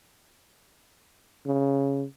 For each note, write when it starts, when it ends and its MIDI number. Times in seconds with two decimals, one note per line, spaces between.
1.46 2.05 49